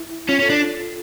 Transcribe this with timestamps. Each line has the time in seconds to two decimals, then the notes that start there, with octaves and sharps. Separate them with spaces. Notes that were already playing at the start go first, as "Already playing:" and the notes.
Already playing: E4
0.29 C#4 F4
0.40 C#4 A4
0.50 D4